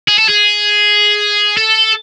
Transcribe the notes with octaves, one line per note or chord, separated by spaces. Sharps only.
G#4
A4
G#4
A4